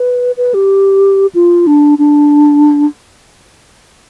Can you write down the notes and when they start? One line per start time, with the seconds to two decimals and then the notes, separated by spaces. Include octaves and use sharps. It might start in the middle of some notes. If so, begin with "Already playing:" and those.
Already playing: B4
0.37 B4
0.54 G4
1.35 F4
1.67 D4
1.99 D4